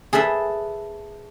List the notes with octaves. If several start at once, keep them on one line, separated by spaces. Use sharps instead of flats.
G#4 A4 B4 E5